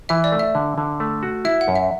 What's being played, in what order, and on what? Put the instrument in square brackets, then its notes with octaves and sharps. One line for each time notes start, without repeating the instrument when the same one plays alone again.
[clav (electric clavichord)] E3 [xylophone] E5
[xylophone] D5
[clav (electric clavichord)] A3
[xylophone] E5
[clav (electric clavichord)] D3
D3
A3
F#4
[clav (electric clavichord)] E4 [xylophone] E5
[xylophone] F#5
[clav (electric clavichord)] F#2
[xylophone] E5